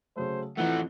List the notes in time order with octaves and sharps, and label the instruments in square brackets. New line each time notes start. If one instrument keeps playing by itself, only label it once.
[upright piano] C#3 F#3 A3 [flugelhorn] C5
[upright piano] F1 F3 G7 [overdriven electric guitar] E3 A3 [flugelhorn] F#5